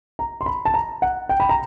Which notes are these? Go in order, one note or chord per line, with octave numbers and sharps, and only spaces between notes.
A#5
C6
B5
A5
A#5
F#5
G5
B5
A#5